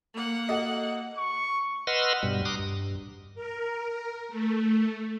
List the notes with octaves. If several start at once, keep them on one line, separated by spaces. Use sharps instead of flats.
A#3 F#5
F#4 A4 D#5
C#6
B4 D#5 F#5 C6 E6 F6
G2 B2 G3
A#5 C6 D6 D#6 F#6
G2
A#4
A3